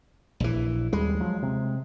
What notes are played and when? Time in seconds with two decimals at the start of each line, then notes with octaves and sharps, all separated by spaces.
0.40 A#1 E3
0.93 D#2 G3 G#3
1.20 F3 F#3
1.43 C3